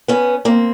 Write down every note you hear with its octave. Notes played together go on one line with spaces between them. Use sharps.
B3 C#4
A#3 C4